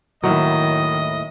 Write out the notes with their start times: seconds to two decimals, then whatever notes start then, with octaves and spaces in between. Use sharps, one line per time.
0.24 D#2 A2 D#3 F#3 E4 D#5